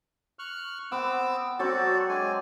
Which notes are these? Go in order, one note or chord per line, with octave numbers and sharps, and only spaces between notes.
C#6 F6 F#6
B3 C4 D6 E6
F#3 C4 F#4 A4 D5 C#6
G#3 D4 G#5